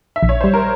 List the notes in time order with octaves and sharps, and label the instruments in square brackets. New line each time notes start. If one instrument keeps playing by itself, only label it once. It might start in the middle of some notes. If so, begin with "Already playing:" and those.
[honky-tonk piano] E5
[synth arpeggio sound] A#1
[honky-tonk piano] C#5
[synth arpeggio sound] G3 [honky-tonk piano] C5
[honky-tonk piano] A#4